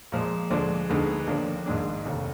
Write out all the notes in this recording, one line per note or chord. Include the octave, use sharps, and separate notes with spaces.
A#2 F3 G#3
D2 D3 F3 G#3 D4
D2 D3 G#3 B3 D#4
D#2 D3 F3 A#3 D4
A#1 G#2 D#3 G#3 D4
F1 D#2 D3